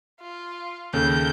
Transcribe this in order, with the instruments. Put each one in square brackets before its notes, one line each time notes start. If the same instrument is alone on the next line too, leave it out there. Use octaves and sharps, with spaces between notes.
[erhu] F4
[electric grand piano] D#2 C#3 A4 [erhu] G6